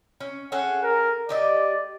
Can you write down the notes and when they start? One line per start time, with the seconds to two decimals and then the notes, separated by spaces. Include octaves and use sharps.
0.20 C#4
0.52 C#4 G#4 A4 F#5
0.83 A#4
1.29 A3 G4 D5 D#5